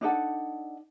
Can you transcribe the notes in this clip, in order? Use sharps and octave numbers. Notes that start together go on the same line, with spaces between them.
D4 D#4 A4 F#5